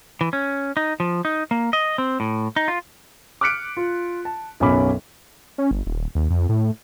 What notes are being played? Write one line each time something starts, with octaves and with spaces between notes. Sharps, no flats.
E3
C#4
D#4
F3
D#4
A#3
D#5
C4
A2
D#4
F4
D6 F6 F#6 B6 C#7 D7
F4
A5
B1 F#2 B2 C#4 B5 D6
C#4
G1
D#1
D#2
F2
A2